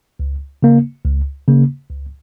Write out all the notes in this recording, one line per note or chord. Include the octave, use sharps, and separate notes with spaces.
C#2
C#3 A#3
C#2
C#3 A#3
C#2